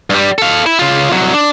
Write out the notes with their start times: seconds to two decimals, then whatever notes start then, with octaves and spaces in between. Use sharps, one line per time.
0.10 G2 G3
0.38 A4 F5
0.66 E4
0.79 C#3 F4
1.10 C2 F#3
1.34 D4